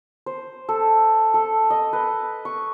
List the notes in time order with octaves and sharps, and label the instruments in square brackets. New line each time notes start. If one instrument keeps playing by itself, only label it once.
[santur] C5
A4
A4
D#5
B4
C#6